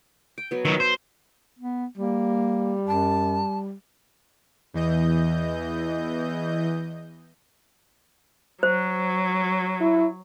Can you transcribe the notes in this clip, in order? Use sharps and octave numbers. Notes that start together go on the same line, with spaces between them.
G5
F#3 B3
D#3 F#3 E5
C5
B3
G3 A#3
F#2 A5
E2 E3 D#5 G6
F#3 C5
E4